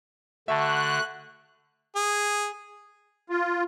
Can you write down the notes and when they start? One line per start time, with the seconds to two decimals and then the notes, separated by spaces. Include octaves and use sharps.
0.48 D3 A3 F#4 E5 A5 F#6
1.96 G#4
3.30 F4